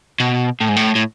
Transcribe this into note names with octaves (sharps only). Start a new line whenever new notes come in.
B2
A2
G#2
A2
A2